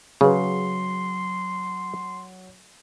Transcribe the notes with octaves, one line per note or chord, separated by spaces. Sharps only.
C#3 F#3 G#4 B4 C6